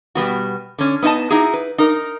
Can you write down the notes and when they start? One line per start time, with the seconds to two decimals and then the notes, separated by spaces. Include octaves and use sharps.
0.15 B2 G3 B3 F#4
0.78 D3 C#4
1.03 B3 D#4 E4 D#5 A5
1.30 D#4 E4 F#4 G#4
1.54 B4
1.78 D#4 A#4